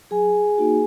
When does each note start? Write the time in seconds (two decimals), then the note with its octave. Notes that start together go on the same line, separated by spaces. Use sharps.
0.11 F#3 G#4 G#5
0.58 A#3 D#4 F#4